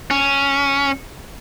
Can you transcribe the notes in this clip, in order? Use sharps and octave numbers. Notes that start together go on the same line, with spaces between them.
C#4